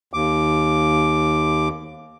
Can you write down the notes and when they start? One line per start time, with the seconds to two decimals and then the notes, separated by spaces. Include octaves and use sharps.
0.13 D#2 D6